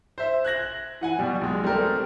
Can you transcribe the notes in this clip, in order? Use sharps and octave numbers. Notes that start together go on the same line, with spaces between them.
C5 E5
F#6 G#6 A#6 F#7
E3 F#5 G#5
B2 G3
B1 G#3
G3 A3 C4 A4 A#4